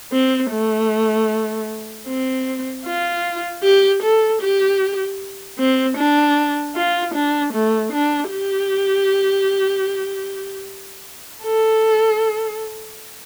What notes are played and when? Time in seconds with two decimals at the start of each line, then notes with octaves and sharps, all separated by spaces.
0.13 C4
0.51 A3
2.08 C4
2.85 F4
3.64 G4
4.03 A4
4.42 G4
5.59 C4
5.97 D4
6.76 F4
7.15 D4
7.54 A3
7.93 D4
8.31 G4
11.43 A4